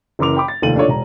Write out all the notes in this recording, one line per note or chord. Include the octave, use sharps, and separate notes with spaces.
F#1 F#2 E3 A#4 D6 F7
G5 B5 D6
A6
F1 D#2 A3 F4 D#7 F#7
D4 F4 A4 C#5 D5
E1 A#5